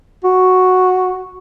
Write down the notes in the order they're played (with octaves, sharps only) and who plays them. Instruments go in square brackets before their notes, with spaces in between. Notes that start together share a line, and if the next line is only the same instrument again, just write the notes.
[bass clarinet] F#4